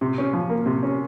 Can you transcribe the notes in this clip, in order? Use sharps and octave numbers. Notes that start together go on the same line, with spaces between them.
C3
C#4
F3
A#3
C3
C#4